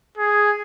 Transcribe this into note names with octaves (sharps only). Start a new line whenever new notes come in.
G#4